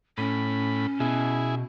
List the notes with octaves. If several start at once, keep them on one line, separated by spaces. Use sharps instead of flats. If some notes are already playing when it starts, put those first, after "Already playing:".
A2 C#4 B5
B2 E4 G#4